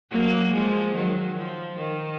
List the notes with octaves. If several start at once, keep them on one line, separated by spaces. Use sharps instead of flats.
F#3 A#3
F3 G#3
D#3 F#3
F3
D#3